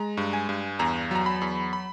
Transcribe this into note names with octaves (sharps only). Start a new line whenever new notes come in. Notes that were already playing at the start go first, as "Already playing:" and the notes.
Already playing: G#3 A#5
G2
G#5
G2
E2 A#5
F#3 A#5
B5
E2
B5